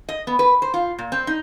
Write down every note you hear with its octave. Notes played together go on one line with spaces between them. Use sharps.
D#5
B3
B4
C5
F4
A#2
C4
D#4